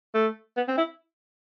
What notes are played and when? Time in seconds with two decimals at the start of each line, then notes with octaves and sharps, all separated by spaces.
0.14 A3
0.57 B3
0.68 C4
0.78 E4